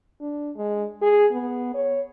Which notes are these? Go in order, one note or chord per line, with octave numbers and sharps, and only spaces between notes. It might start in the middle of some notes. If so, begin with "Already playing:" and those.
D4
G#3
G#4
B3
C#5